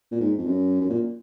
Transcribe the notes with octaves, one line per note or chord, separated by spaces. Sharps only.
A#2
G#2
F2
F#2
F#2
A#2